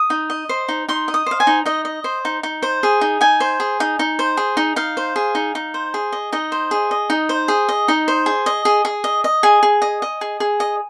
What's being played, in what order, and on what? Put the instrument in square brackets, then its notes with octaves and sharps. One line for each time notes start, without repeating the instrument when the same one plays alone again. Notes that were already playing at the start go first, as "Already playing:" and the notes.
Already playing: [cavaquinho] D#6
D#4
D#5
C5
D#4
D#4 C6
D#5
D#6
C5 F5
G#5
D#4
D#4 D#5
D#5
C5
D#4
D#4
C5
G#4
D#4
D#4 G#5
C5
G#4
D#4
D#4
C5
G#4
D#4
D#4 F5
C5
G#4
D#4
D#4
C5
G#4
D#5
D#4 D#5
C5
G#4
D#5
D#4
C5
G#4
D#5
D#4
C5
G#4
D#5
G#4
G#4
D#5
D#5
G#4 G#5
G#4
D#5
D#5
G#4
G#4
D#5